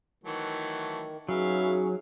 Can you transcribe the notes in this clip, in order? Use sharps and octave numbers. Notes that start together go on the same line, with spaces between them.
D#3 E3 F#3 A3
F#3 C#4 D#4 F#4 G#4 B4 E5 F5